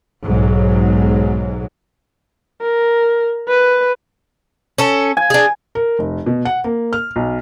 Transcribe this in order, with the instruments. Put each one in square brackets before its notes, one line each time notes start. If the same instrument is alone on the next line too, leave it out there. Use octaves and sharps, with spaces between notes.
[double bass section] B1 G#2 F#3
[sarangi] A#4
B4
[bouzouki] C#4 A4
[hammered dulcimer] G#5
[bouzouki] D4 G#4
[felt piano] A#4
F1
B2
F#5
A#3
F6
B1